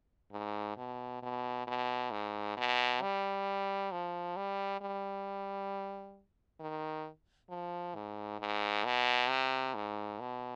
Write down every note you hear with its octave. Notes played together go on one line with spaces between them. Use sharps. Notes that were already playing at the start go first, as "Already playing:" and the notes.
G#2
B2
B2
B2
G#2
B2
G3
F3
G3
G3
D#3
F3
G#2
G#2
B2
C3
G#2
B2